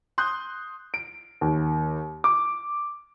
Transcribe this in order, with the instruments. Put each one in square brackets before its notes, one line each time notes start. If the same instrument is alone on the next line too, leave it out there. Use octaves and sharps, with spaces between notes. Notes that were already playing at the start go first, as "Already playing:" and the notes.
[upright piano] C6 D#6 F#6 G6
[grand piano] D7
D#2
D6